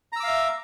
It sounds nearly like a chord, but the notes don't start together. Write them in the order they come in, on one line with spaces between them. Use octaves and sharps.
A#5 E6 D6 F5 E5